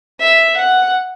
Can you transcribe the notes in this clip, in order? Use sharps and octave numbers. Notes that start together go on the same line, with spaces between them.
E5
F#5